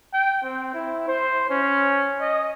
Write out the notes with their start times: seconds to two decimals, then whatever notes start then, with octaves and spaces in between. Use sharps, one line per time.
0.13 G5
0.43 C4
0.74 E4
1.08 C5
1.50 C#4
2.21 D#5